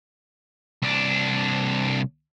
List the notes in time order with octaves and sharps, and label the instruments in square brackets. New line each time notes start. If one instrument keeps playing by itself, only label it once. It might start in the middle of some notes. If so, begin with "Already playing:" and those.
[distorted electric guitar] C2 D4